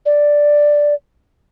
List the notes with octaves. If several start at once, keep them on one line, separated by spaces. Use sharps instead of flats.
D5